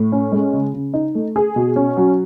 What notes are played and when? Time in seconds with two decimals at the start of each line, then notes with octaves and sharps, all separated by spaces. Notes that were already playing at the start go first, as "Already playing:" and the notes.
Already playing: A2
0.12 C#4
0.32 G#3
0.53 C#3
0.74 C#3
0.94 D#4
1.15 A3
1.36 G#4
1.56 B2
1.76 C#4
1.97 F#3